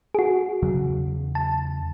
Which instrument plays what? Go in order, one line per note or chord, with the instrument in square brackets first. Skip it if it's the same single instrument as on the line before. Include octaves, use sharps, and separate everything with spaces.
[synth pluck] F#4 G#4
[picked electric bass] E2 C#3 F#3
[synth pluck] A5